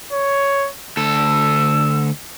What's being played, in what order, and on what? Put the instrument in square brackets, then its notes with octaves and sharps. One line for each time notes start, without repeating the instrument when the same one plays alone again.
[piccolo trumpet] C#5
[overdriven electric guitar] D2 A4 [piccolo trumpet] E6